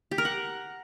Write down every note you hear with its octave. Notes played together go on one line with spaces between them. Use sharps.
G4
A#4
F#5